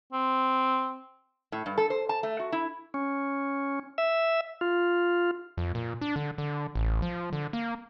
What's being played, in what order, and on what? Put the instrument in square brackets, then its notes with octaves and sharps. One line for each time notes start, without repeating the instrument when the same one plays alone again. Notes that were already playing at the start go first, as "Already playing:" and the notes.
[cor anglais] C4
[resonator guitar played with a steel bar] A2
G2
A4
C5
A5
A3
F#4
E4
[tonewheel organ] C#4
E5
F4
[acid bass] F2
A#2
D4
D3
D3
A1
F3
D3
A#3